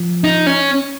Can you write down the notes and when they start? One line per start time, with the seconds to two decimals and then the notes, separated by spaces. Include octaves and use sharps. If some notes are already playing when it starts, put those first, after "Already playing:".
Already playing: F3
0.24 D#4
0.47 C#4